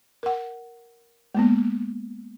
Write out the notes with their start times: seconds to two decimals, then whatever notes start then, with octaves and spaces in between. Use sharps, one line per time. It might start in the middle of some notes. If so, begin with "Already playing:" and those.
0.23 A#4 F#5
1.35 G#3 A#3 B3